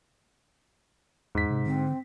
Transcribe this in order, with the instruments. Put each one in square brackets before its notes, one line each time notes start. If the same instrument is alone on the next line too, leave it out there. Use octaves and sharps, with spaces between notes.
[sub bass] E2 [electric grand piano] G#2 B6
[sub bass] C3
[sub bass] D3 [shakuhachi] C4